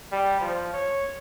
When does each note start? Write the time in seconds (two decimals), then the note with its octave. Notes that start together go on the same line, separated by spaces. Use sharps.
0.12 G3
0.41 F3
0.73 C#5